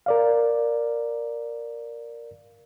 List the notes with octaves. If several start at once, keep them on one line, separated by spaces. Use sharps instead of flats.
A#4 D5 F5